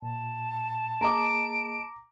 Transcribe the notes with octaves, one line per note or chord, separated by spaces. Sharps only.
A#2 A5
A#3 G#4 D#5 A#5 D6 D7